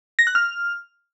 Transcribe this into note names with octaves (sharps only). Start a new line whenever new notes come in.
A#6
F#6
F6